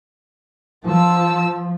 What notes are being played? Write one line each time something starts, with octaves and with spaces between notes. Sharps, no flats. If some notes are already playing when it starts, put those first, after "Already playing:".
F3 A5 E6